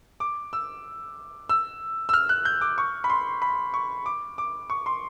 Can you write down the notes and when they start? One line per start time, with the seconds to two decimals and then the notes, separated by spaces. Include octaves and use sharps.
0.20 D6
0.53 E6
1.49 E6
2.09 E6
2.14 F6
2.29 F#6
2.45 G6
2.61 D6
2.78 C#6
3.04 B5
3.10 C6
3.42 B5
3.74 C#6
4.06 D6
4.38 D6
4.70 C#6
4.86 C6